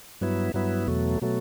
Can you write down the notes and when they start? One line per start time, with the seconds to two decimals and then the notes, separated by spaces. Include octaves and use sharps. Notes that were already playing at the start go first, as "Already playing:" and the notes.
0.21 G2 F#3 B3 E4
0.54 G2 F#3 B3 E4
0.87 E2 B2 F#3 A3
1.21 B2 F#3 A3